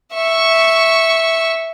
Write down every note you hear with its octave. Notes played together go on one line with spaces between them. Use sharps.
E5 C#6